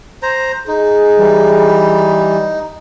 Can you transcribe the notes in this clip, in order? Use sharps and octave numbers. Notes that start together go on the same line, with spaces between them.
C5 A#5
D#4 G#4
E3 G3